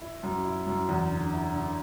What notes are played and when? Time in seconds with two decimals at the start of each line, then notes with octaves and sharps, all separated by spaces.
0.01 E4
0.23 F#2
0.44 E4
0.67 F#2
0.89 E2
1.11 D3
1.33 E4
1.54 D3